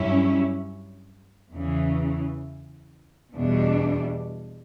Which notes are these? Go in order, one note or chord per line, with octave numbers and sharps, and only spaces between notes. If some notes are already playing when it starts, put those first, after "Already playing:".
Already playing: G2 F#3 C#4 E4
E2 C#3 E3
E2 B2 G3 D4